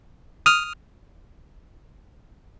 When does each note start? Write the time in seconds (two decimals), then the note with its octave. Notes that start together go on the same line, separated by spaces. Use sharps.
0.46 D#6 F6